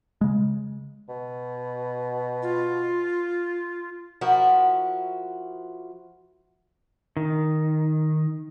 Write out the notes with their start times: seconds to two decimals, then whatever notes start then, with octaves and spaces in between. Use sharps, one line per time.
0.21 C#3 G#3
1.09 B2
2.42 F4
4.21 F3 E4 F#4 A#4
7.17 D#3